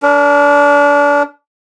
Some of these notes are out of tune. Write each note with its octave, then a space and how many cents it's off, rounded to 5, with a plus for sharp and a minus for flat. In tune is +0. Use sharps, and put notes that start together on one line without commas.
D4 -30 A#4 +0